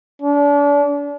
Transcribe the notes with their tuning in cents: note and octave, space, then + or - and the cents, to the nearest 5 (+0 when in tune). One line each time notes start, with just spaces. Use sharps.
D4 -35